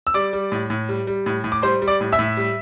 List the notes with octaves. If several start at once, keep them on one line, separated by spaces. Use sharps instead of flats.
E6
G3 D5 D6
G3
A2
A2
G3
G3
A2
A2
D6
G3 C5 C6
G3
D5 D6
A2
E5 E6
A2
G3